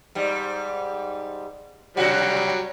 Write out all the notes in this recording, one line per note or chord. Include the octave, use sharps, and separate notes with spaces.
G#2 G3
C3 F#3 G3 F#4